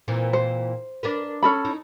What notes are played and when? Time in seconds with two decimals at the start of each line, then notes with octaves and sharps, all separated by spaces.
0.08 A#2 E3 C4
0.33 C5
1.03 D4 A#4 B4
1.43 C#4 A4 B5
1.65 D#4 E4